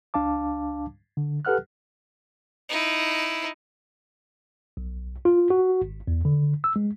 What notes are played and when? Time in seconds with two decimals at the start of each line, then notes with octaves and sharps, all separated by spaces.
0.14 C#2 D4 F5 A5 D6
1.17 D3
1.45 G4 A4 B4 F#5 F6 F#6
2.69 D#4 E4
4.77 B1
5.25 F4
5.50 F#4
5.82 G#1
6.08 E2
6.25 D3
6.64 E6
6.76 G#3